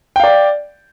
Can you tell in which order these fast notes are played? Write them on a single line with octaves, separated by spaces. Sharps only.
G5 F5 D5